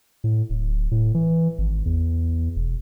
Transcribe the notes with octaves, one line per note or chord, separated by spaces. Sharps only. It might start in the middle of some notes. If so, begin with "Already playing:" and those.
A2
D1
A2
E3
G#1
E2
E1